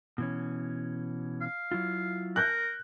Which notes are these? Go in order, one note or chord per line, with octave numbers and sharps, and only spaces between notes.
B2 E3 C#4
F5
F#3 E4 F4
A#4 F#6 G6